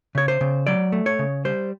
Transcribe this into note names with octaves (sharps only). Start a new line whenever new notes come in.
C#3 C#5
C5
C#3
F#3 D5
A3
C#5
C#3
G3 C5